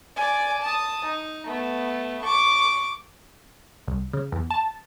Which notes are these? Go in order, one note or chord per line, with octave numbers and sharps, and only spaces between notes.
D5 G#5
A5 D#6
D#4
A3 B3
C#6 D6
C2
C#3
E2
A5